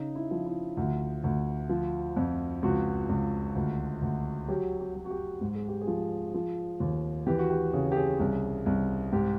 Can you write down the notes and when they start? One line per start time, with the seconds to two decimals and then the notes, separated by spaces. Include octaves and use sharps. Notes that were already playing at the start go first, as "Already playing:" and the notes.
Already playing: C#3 D#4
0.15 E4
0.31 F3
0.46 E4
0.77 D2
1.24 D2
1.70 F3
2.17 F2
2.63 C#2 F#4
3.09 C#2
3.56 D2
4.02 D2
4.48 F#3 G4
4.80 G4
4.95 F#3
5.05 F#4
5.10 G4
5.41 G#2
5.55 G#4
5.68 G4
5.81 G#4
5.87 F3
6.34 F3
6.80 D#2
7.27 E3 G4
7.39 F#4
7.50 G4
7.73 C#3 G#4
7.92 G4
7.97 G#4
8.20 C2
8.66 C2
9.12 G#2 G4